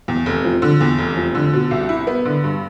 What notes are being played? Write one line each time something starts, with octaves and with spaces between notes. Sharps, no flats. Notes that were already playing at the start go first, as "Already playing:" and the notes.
E2
F1
F3
D3
E2
F1
F3
D3
B2
C2
E4
B3
D3
G2